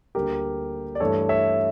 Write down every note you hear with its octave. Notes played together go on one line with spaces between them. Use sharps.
D2 D3 G3 A#3 G4 A#4
D5
G2 E3 A3 A4 C#5
C#5 E5